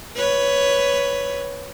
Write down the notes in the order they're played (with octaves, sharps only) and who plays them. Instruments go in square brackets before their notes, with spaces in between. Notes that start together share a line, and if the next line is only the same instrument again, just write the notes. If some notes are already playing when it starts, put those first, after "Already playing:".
[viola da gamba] B4 C#5